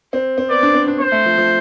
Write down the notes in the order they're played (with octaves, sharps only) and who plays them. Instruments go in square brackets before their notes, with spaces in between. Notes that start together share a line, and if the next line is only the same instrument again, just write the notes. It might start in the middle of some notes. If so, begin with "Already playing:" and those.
[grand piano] C4
C4
[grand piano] B3 [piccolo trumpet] D5
[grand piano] D4
C4
D4
[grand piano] C4 [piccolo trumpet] C5
[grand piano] A3
F3
F3